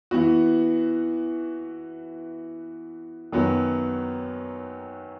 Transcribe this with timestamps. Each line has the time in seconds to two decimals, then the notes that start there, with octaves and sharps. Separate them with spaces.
0.11 E3 B3 F#4
3.32 F#2 D#3 F#3 B3